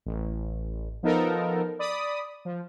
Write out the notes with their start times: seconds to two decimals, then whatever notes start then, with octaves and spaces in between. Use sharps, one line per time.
0.06 A1
1.03 F3 B3 D#4 A4 A#4
1.79 D5 B5 D#6
2.45 F3